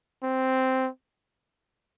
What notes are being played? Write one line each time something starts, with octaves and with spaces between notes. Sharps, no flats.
C4